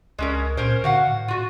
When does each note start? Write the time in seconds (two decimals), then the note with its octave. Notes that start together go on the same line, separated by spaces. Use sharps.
0.19 C#2 G#3 C#4 A#4
0.57 A#2 C#4 A#4 C5
0.84 D3 F#4 F5 F#5
1.07 A2
1.28 F4 F#4